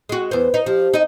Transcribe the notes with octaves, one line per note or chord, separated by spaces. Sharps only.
G#3 F#4
E2 B4 C5
D#4
F3 G4
D#4 D#5